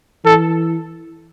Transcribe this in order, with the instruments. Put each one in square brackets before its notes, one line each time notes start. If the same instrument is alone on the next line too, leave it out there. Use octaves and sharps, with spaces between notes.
[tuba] E3 [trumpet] A4